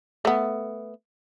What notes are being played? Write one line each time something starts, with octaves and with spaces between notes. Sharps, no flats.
A3 B3